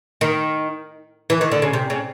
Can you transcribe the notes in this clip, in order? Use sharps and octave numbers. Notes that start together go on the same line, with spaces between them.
D#3
E3
D#3
D3
C#3
C3
C#3